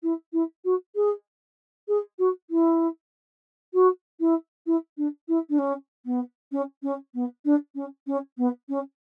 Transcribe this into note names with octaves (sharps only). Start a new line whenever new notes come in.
E4
E4
F#4
G#4
G#4
F#4
E4
F#4
E4
E4
D4
E4
D4
C#4
B3
C#4
C#4
B3
D4
C#4
C#4
B3
C#4